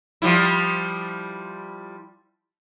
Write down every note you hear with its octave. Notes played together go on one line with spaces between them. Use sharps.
F3 G3 E4